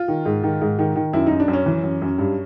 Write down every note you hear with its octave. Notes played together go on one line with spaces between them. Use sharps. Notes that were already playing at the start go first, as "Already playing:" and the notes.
Already playing: F4
D#3
G#2
D#3
G#2
D#3
D#3
F#2 E4
F#2 D#4
D4
F#2
C#4
E3
F#2
F#2
G2